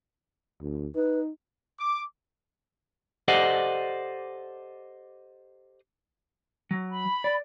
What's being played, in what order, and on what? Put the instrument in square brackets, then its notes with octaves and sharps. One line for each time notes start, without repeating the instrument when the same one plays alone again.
[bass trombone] D2
[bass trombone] D#4 [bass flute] B4
[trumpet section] D6
[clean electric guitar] G4 A4 C5 D5 D#5 F#5
[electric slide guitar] F#3
[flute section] B5
[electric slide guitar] D5